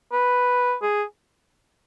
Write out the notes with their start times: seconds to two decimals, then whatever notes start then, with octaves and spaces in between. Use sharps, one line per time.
0.12 B4
0.82 G#4